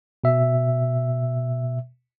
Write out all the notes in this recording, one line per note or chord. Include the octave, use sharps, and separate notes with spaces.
B2 E5